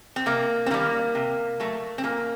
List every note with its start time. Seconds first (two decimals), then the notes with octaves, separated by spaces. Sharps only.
0.16 C4
0.26 C3 A#3
0.66 C4
0.71 D#3 G3 A#3
1.15 C3
1.60 F#3 A3
1.98 C4
2.04 A#2 A#3